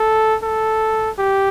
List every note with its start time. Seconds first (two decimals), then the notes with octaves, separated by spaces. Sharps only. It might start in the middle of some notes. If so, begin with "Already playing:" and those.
Already playing: A4
0.43 A4
1.19 G4